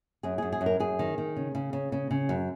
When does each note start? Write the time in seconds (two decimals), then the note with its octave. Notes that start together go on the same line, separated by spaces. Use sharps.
0.23 F#2 G#4
0.38 F#2 G#4
0.52 G#4
0.61 F#2
0.66 A#4
0.80 F#2 G#4
0.99 D#3
1.18 D#3
1.37 C#3
1.55 C#3
1.73 C#3
1.92 C#3
2.11 C#3
2.29 F#2